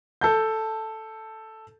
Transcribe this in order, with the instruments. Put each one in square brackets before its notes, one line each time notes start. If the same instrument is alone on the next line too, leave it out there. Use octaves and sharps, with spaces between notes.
[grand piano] A4 A5 G6